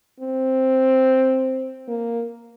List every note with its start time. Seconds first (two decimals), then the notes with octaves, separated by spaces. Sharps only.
0.20 C4
1.88 A#3